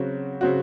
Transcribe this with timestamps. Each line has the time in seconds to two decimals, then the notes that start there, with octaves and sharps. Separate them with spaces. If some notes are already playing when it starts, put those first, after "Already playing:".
Already playing: C#3 F#3 C4 F#4
0.41 C#3 F#3 C4 F#4